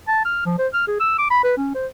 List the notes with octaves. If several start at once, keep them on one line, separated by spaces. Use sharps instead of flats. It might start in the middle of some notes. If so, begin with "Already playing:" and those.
A5
F6
F3
C5
F6
G#4
E6
D6
B5
B4
C#4
C5